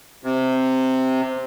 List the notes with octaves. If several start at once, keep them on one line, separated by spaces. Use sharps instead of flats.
C3